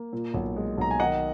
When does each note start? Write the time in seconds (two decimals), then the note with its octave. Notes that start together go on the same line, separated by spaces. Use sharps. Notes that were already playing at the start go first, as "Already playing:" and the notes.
Already playing: A#3
0.13 A#2
0.34 B1
0.56 G#3
0.78 B1 A#5
0.91 G#5
1.00 D#3 D#5 F#5